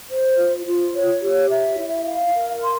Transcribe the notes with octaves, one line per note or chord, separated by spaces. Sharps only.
C5
F4
F4
C#5
G4
E5
E4
F5
A#4
C6